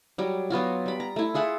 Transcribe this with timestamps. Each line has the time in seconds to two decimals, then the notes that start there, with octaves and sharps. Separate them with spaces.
0.18 F#3 G3
0.50 F#3 B3 F4 F#4
0.86 G3 B5
1.00 A#5
1.16 A3 E4
1.34 F4 G#4 E5 F#5